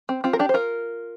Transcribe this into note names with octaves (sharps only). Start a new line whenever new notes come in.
C4
C4 F4
A#4
D4 G4
C5
F4 A#4